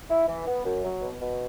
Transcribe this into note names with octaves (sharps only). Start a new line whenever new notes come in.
E4
E3
B3
F#2
F#3
B2
B2